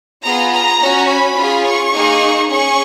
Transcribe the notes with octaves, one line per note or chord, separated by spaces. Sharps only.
B3 F4 G#4 A#5
A#5
C#4 F#4
B5
C#4 F4 G#4
C#6
A#3 D#4 G#4
C#4 G#4 C#6